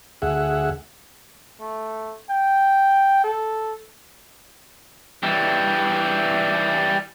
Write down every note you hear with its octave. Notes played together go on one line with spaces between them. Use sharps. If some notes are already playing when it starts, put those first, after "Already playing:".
D2 G#4 E5 F#5
A3
G5
A4
E3 G3